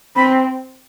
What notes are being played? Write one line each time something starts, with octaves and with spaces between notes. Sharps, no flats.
C4 B5